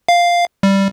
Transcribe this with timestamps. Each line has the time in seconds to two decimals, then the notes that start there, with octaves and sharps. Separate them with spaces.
0.09 F5
0.63 G3